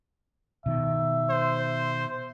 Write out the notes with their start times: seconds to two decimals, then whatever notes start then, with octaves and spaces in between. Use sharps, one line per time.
0.66 B2 D#3 E5
1.30 C5